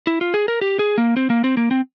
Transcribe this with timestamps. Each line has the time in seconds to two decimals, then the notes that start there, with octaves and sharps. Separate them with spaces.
0.07 E4
0.21 F4
0.34 G#4
0.48 A#4
0.61 G4
0.79 G#4
0.98 A#3
1.17 C4
1.30 A#3
1.44 C4
1.57 A#3
1.71 C4